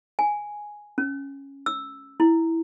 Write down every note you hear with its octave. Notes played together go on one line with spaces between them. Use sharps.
G#5
C#4
E6
E4